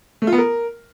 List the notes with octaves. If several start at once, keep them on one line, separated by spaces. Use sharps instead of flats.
A3
F4
B3
A#4